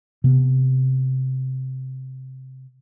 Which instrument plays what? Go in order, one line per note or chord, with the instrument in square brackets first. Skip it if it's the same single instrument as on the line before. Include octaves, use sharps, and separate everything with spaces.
[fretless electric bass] C3 B3